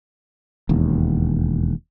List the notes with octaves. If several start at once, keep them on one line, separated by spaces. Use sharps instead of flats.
E1 D#2